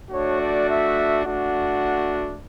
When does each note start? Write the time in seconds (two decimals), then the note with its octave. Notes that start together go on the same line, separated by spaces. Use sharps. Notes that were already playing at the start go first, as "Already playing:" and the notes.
0.11 A3 D4 F#4 C#5
0.40 D5
0.68 E5
1.25 A3 D4 F#4 F#5